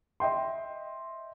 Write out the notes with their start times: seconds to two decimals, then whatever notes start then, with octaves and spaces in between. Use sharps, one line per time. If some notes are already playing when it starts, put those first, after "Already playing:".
0.20 D#5 E5 G5 C6